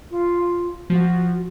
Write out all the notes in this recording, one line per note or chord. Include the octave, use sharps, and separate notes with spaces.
F4
F3 F#4